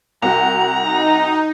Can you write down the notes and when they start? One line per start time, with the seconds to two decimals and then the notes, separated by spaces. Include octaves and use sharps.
0.22 C2 F#4 A#5
0.82 D#4